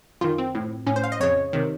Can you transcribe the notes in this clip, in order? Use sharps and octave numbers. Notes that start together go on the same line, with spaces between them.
F#2 D#3 F4
C4
A2
A2 C#4
C5
F5
D#5
F2 C#3 C#5
C3 D#3